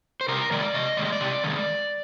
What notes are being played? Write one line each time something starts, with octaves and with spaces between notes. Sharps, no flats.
C5
C3 A#4
D#3 G#3 D5
C3 D#5
D#3 G#3 D5
D#5
D5
C3
D#3 G#3